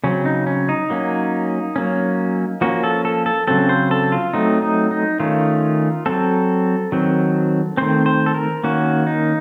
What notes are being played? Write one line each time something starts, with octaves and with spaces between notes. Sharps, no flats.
C#3 F#3 C4 C#4
D#4
C#4
D#4
F#3 A#3 C#4
F#3 A#3 C#4
F3 A#3 C#4 F#4
A4
A4
A4
C#3 F#3 C4 A4
C5
A4
F4
F#3 A3 C4 D#4
D#4
D#4
D#3 A3 C#4 F4
F#3 C4 A4
D#3 F#3 C4
D#3 A3 C4 C5
C5
A4
A#4
D#3 A#3 C#4 F#4
D#4